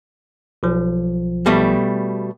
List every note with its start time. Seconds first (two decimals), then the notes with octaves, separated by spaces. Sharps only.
0.63 B1 F3
1.46 B2 G3 A3